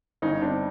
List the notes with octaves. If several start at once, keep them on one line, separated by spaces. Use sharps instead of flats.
G1 C#4 D#4
C4 D4